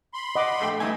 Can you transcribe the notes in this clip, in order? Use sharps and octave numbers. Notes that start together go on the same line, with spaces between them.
B5 C6
D#5 F#5 D6
A#1 A3 G5
G2 E3 A3 D#4 E5 G#5 D#6